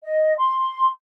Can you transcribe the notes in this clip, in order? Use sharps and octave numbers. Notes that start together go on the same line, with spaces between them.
D#5
C6